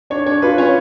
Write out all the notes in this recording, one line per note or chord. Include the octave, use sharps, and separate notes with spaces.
D4 C#5
D4 C#5
F4 B4
C#4 C#5